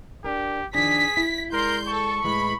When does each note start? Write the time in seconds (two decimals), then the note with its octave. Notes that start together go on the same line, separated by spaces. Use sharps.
0.24 D4 G4 A#4
0.75 D#3 F3 D4 G#4 B6
1.17 E4
1.53 G#3 A#4 D5 C6 G6
1.88 A4 C#6
2.24 A2 E3 G#3 B5